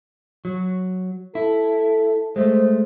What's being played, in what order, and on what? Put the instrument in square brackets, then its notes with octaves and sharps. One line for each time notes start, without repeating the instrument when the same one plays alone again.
[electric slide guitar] F#3
[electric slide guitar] E4 [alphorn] A4
[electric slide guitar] G#3 A3 [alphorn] C5